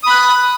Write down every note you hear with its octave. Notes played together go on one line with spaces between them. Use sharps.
B5 D#6 F#6